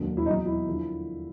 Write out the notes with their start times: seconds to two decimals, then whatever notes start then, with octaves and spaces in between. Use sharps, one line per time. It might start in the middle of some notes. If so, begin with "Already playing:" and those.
Already playing: E1 D#2 D3 F#3
0.17 E4
0.26 E2 B2 F#3 D#4
0.46 E4
0.68 D3 F3